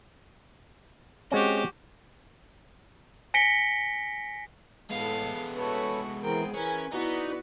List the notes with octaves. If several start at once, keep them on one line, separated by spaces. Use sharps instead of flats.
G#3 C4 C#4 F#4 G4
G#5 A#6 B6 C#7 D7 G7
A2 G#3 B3 A4 F5
A3 F#4 A4 B4 C#5
E3 C4 G#4 A#4 G5
E3 C#4 A#4 B4 G#5
B3 D#4 E4 F#4 B4 D5